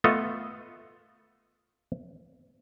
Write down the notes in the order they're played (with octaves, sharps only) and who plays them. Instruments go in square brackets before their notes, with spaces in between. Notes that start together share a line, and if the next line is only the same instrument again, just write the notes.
[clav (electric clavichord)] A3 B3 F4 A4 D#5